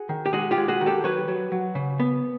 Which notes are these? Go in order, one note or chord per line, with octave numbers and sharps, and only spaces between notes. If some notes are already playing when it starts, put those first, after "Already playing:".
Already playing: F#4 G#4
D#3
G4
G#3 F#4 G#4
F4 G4
G#3
F#4 G#4
D#3
G4 A4
F#3 B4 C#5
F#3
F#3
C#3
B3